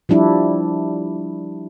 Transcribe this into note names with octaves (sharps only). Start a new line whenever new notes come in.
F3 G3 D4 E4